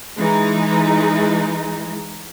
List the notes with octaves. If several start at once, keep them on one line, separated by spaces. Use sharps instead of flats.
E3 G#3 D#4